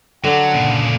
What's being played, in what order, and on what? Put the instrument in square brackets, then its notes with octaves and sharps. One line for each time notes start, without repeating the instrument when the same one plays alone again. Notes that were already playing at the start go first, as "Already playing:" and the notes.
[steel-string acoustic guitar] D3 [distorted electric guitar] F#3 [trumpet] F#5
[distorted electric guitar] A#2 C#3